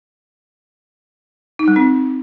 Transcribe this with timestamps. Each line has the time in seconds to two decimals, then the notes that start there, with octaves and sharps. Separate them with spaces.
1.59 D#4
1.68 G3
1.76 C4